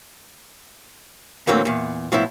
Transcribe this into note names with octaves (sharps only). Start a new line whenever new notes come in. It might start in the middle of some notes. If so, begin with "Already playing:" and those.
D2 A2 E3 F#3 A#3 C4
E2 A#2
A2 F3 F#3 B3 E4